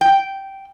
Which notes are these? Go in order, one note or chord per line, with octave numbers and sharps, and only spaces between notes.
G5